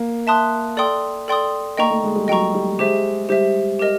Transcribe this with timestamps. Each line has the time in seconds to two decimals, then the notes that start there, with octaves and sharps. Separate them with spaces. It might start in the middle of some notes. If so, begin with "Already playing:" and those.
Already playing: A#3
0.27 E5 A5 C6 D#6 F#6
0.77 A4 D5 G5 C6 D#6
1.28 A4 D5 G5 C6 D#6
1.77 A#3 D#5 G5 A#5 C#6
1.90 A3
2.03 G#3
2.16 G3
2.28 F#3 D#5 G5 A#5 C#6
2.54 G3
2.78 G#3 G4 C5 E5
3.29 G3 G4 C5 E5
3.79 G4 A#4 D#5